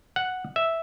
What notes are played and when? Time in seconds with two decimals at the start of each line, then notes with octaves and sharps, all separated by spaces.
0.16 F#5
0.56 E5